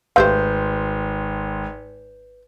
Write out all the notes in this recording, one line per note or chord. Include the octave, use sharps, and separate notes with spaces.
G#1 A3 G4 B4 C5 F5 C6 G6